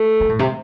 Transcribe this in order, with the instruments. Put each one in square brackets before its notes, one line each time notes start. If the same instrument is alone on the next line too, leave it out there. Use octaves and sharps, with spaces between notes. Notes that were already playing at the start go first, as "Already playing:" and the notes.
Already playing: [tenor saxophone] A3
[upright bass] C3
A2
C3